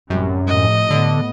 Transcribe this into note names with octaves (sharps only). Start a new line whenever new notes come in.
A1 F#2 C3 G3
A2 C3 F3 D#5
A2 D3 B3